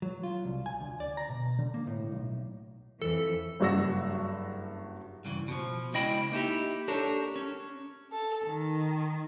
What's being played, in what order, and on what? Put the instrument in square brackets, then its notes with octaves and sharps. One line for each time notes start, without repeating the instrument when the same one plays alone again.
[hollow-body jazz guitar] F#3
F4
C2
G#5
D2
D5
A#5
B2
D3
A#3
A2
B1
[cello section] F2 E3 [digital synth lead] A4
[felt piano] F#1 G2 F#4 E6 A#6
[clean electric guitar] G2 C#3 E3
B2 F3
C#2 C#4 E4 D#5 G5 B5
A#3 D#4 E4 G4
D4 G4 A4 A#4 C#5
C#4
[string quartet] A4
D#3